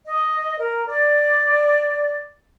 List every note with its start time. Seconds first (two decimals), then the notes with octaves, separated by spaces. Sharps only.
0.06 D#5
0.58 A#4
0.87 D5